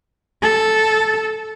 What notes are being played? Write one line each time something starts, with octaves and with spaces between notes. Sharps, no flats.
A4